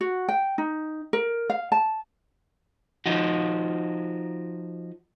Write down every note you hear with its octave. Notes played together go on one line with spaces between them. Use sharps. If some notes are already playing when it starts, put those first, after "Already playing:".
F#4
G5
D#4
A#4
F5
A5
F3 D#4 F#4